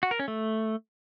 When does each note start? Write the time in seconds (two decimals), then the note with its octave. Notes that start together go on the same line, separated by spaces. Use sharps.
0.03 F#4
0.11 A#4
0.19 C#4
0.28 A3